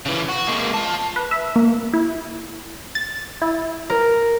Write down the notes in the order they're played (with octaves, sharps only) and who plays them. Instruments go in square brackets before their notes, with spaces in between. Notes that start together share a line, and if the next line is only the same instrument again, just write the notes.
[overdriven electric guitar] C#3 E3
F#4
G#3 A#3
F4 A5
[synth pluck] B4
E5
A#3
E4
A6
E4
[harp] A#4